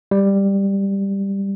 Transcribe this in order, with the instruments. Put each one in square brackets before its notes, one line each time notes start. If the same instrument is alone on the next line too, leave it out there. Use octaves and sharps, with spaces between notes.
[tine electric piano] G3